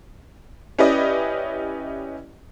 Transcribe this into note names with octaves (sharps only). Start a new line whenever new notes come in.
C#4 E4 G4 B4 D5 D#5